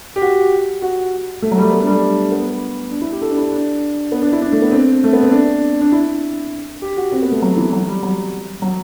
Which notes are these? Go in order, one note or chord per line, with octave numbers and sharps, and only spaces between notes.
G4
F#4
F#4
A3
F#3
G3
A3
B3
D4
G3
A3
B3
D4
E4
G4
A4
D4
E4
D4
B3
D4
E4
D4
A3
B3
C4
A3
B3
C4
D4
D4
E4
G4
F#4
C4
B3
A3
F#3
E3
F#3
G3
F#3
F#3